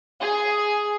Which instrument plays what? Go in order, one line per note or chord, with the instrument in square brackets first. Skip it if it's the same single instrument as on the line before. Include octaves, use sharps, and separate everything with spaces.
[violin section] G#4